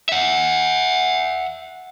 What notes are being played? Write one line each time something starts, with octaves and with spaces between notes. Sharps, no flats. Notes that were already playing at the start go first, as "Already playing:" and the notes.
E5 F#5